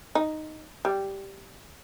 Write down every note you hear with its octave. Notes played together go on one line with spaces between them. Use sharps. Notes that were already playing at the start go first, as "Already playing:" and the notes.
D#4
G3